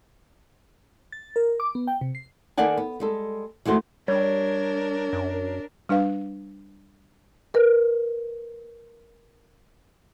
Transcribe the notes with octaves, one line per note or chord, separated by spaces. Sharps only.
A6
A#4
D6
B3
G5
C3
C7
D#3 A#3 A4 D5 F#5 G#5
B3
G3 G#3 A4
E3 G#3 A3 F#4 C5
G3 D4 A#4 C#5
F#2
G3 D4 B4 F5
A#4 B4